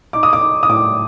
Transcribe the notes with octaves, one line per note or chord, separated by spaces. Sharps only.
D#4 D6
D#6
D6
D#4
D#6
A2 D6